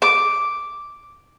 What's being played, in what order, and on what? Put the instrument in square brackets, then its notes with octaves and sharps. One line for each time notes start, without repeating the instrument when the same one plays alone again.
[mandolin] D6